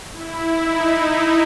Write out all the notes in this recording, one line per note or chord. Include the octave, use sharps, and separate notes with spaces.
E4
D#4